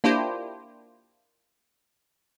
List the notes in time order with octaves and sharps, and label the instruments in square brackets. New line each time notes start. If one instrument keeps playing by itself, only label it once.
[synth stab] A#3 D4 E4 F4 G4 C5